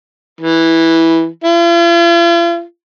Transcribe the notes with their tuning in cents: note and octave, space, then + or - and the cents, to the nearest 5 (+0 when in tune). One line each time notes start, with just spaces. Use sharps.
E3 -10
F4 -45